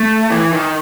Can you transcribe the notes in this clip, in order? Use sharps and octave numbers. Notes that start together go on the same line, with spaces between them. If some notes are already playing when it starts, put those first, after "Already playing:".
Already playing: A3
E3
D#3